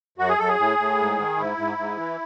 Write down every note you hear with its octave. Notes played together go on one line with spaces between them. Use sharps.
F#2 F#4
G#4
F#2 A4
G#4
A2
A2
G#2
D#3
G#2 E4
G#2
G#2
E3